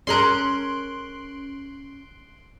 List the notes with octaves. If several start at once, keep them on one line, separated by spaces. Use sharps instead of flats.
C#4 G#4 A#4 C6 F#6 D7